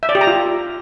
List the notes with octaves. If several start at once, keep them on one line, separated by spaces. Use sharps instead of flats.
E5
D5
G4
A#5
F4